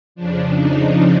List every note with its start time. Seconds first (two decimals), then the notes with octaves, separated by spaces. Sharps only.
0.15 F2 C#3 F3 D4
0.55 D#4